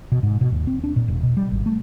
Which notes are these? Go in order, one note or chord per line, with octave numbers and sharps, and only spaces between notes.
B2
G#2
B2
D#2
C4
D4
A#2
E1
B2
G3
G#1
A3